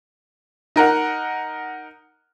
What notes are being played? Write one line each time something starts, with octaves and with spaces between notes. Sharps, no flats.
D#4 A#4 F#5